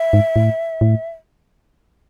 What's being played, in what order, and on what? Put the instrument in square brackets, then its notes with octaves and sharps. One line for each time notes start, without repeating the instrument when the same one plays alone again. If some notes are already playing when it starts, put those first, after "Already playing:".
Already playing: [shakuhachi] E5
[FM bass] G#2
A2
A2